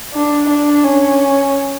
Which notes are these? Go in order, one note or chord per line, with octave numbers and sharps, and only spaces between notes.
D4
D4
C#4